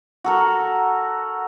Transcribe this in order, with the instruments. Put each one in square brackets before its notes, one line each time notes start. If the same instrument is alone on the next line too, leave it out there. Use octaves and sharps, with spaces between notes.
[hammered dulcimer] F#4 A4 A#4